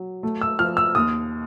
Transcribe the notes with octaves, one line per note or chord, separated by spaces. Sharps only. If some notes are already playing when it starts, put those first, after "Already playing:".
Already playing: F#3
A3
E6
F3 F6
E6
D#2 D#6